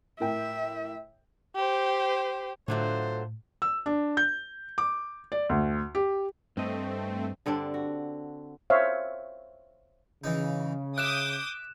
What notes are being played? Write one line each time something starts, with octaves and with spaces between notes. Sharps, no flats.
A2 A#4 E5 G5
G4 C5
A2 D3 F#3 A3 F4 C5
E6
D4
G6
D6
D5
D2
G4
G2 A3 C4 D#5
G2 D3 C4 D4
F#4
C5 C#5 E5 F5
C#3 E3 D#4
E5 D6 D#6 F#6 G6 E7